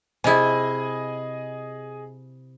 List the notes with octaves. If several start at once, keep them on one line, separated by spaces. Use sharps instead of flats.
C3 E4 G#4 D#5 G#5